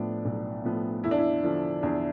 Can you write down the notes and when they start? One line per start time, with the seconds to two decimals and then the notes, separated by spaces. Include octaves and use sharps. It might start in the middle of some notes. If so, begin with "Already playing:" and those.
Already playing: A2 F3 B3 D4
0.25 B1
0.64 A2 F3 B3
1.04 E2 E4
1.11 D4
1.18 E4
1.43 D3 F3
1.83 E2 D4